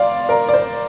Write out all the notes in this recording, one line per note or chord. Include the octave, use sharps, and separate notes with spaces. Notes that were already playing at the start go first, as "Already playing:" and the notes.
Already playing: D5 F5 C6 D6
A#4 D5
D5
C5